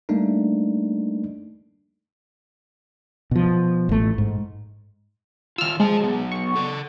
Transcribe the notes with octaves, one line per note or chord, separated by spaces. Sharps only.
G3 A3 A#3 D4 D#4
B2 F3
A1 A3
G#2
D#3 F4 E6 F6
G#3 C5 A5
F#3 B3
C#6
A4 F#5